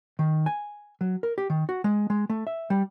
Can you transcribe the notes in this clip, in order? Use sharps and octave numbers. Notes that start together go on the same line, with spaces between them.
D#3
G#5
F#3
A#4
G4
D#3
F#4
G#3
G#3
A3
E5
G3